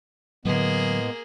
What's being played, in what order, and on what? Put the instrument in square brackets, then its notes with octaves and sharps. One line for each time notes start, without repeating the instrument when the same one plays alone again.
[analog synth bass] A2 [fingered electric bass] D3 F#3 [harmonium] G#3 B3 [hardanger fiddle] A#3 G#4